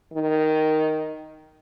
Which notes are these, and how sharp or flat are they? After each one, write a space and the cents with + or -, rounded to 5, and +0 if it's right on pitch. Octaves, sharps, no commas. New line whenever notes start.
D#3 +0